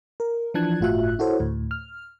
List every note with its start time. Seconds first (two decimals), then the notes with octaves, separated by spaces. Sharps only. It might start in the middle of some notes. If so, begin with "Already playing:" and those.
0.20 A#4
0.54 E3 F3 D4 A5 F#6 G#6
0.81 G1 A2 F4 F#4 E5 F#6
1.19 E4 F#4 A4 C5 C#5
1.40 D2 A2
1.71 F6